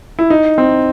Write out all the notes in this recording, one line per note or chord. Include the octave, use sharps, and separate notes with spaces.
E4
D#4
C4